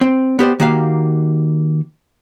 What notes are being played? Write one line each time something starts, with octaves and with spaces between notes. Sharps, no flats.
C4
B3 G4 C5 D5
D#3 A#3 F#4 G4 F5